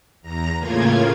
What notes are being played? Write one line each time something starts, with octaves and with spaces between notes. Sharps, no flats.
E2 A#5 A#6
A2 C#3 A#3 F4 G#6